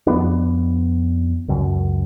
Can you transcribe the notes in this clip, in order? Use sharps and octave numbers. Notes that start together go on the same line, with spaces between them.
F2 F3 B3 D4
C#2 F#2